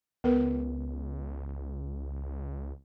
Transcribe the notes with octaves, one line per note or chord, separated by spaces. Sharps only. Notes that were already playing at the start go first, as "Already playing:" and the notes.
C#2 B3 A#4 B4